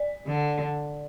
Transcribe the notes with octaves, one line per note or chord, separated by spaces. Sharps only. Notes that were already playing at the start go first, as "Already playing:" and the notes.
Already playing: D5
D3